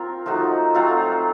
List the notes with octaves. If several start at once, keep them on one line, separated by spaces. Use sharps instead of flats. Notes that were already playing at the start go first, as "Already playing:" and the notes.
Already playing: C4 F4 A#4
F3 A3 D#4 F#4
F#3 A3 C4 F4